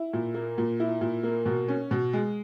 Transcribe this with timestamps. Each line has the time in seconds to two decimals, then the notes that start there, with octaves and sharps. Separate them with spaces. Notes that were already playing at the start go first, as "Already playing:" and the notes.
Already playing: E4
0.13 A#2
0.34 A#3
0.58 A#2
0.80 E4
1.01 A#2
1.23 A#3
1.46 B2
1.68 C#4
1.91 B2
2.13 G#3